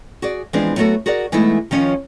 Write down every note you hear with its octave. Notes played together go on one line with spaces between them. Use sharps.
F#4 G#4 D5
E3 F3 G#3 B3 C4 D4
F#3 A3 B3 F4 F#4 A4
F#4 G#4 A#4 D5 F#5
E3 G#3 A3 B3 D#4 E4
D#3 F3 C#4 F4 C#5